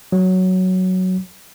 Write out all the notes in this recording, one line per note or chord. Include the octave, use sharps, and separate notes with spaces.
F#3